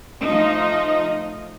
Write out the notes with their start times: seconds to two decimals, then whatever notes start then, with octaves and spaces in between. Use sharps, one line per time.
0.23 F3 A3 D#4 D#5